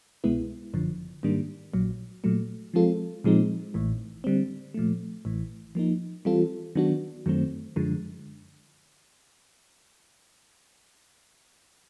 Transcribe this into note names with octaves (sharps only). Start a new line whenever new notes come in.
C2 B2 G#3 B3 E4
G1 F#2 D3 F3
G#2 D#3 G3 A#3 D4
A#1 A#2 F#3
A#2 F#3 A3
F3 G#3 C4 F4 A4
A#2 F3 G#3 C4 D#4
A1 A2 E3
D3 G3 C4
A#2 F3 A3
A1 A2 E3
F3 A#3 D#4
E3 G3 C4 F4 A4
D#3 F#3 B3 D4 F#4
F#2 D#3 F#3 A3 C4
F#2 D3 F3 G#3